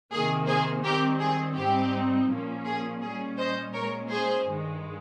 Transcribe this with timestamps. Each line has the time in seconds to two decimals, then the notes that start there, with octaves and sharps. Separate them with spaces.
0.11 C3 D#3 A#3 G#4
0.47 G#4 C5
0.83 D#3 G3 C4 G4 A#4
1.20 G#4
1.57 G#2 G3 C4 D#4 G4
2.29 A#2 F3 A#3 C#4
2.65 G#4
3.01 A#2 G3 C#4 G#4
3.37 C5 D#5
3.73 A#2 G#3 C#4 A#4 C#5
4.10 G#4 C5
4.46 G2 D#3 G#3